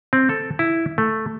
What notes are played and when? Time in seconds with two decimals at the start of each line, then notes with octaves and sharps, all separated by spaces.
0.13 C4
0.29 A4
0.59 E4
0.98 A3